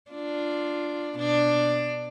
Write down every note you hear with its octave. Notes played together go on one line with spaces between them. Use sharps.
D4 F4
B2 D4